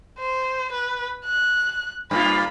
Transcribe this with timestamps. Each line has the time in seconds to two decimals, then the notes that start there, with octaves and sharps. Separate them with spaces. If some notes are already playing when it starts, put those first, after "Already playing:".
0.19 C5
0.72 B4
1.26 F#6
2.11 G2 A#3 F4 B5